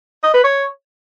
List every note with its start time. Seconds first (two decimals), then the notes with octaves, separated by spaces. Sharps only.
0.24 D#5
0.34 B4
0.44 C#5